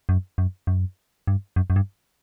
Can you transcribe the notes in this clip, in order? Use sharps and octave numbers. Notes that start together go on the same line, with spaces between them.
F#2
F#2
F#2
G2
F#2
F#2
G2